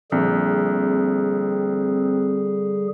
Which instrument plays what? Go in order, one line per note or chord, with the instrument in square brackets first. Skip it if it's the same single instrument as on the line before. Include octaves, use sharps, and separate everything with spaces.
[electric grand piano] A#1 [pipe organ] D3 G3 G#4 [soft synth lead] C4